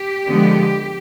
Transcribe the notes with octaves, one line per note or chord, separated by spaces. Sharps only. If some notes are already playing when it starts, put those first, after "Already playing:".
Already playing: G4
D3 F3 G#3 B3